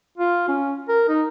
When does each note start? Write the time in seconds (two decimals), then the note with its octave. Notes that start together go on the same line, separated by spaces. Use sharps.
0.17 F4
0.48 C#4
0.89 A#4
1.09 D#4